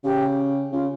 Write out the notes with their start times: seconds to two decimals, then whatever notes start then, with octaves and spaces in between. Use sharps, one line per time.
0.04 C#3 G4
0.72 C#3 F4